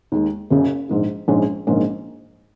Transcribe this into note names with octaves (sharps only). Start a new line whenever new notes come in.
D#2 D#3 G#3
F#1 F#2 C#3
A#1 G#2 D#3
A#1 G#2 G#3 C#4
A#1 G#2 D#3 A#3 C#4